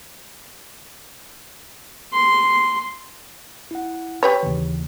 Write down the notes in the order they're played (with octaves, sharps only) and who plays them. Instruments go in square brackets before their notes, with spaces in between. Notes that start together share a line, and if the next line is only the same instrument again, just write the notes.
[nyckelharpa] C6
[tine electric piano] E4 F#5
[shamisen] G4 B4 C#5
[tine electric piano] D#2 C#3 E3